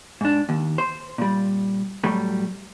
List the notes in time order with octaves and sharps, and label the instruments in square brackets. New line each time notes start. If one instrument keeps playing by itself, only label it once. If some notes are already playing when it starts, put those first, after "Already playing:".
[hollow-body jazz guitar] G#2 D4
D#2
C5
A#2 G3
A2 F#3 G3 A3